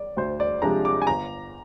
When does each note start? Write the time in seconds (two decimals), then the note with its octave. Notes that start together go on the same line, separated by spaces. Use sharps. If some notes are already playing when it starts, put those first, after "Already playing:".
Already playing: D5
0.17 D2 C5
0.40 D5
0.62 C3 F3 G#3 D4 A#5
0.85 D6
1.02 G#5
1.07 G1 A#5